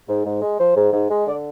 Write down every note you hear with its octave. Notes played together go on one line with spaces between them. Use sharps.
G#2
G#2
G#3
F3 C5
G#2
G#2
G#3
D3 D5